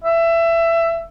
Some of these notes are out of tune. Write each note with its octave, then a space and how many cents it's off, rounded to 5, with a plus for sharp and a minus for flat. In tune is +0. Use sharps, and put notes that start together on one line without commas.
E5 +20